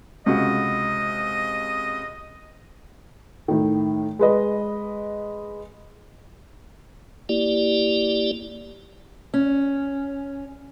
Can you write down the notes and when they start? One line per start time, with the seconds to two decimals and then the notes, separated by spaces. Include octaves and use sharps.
0.26 C#2 C3 F#4 D#5
3.48 A2 D#3
4.19 G#3 B4 D#5
7.29 A#3 E4 G4 D5
9.34 C#4